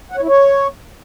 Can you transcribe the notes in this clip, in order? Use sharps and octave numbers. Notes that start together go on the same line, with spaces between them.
F#5
C#5
E4
C#5